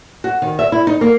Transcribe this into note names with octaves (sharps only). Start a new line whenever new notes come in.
F#4
D#3
E5
E4
D#4
A#3